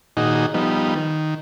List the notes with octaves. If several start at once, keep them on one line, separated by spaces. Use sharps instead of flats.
A#2 D#3 D#4 F#4 G#4
F3 G3 B3 D#4
D#3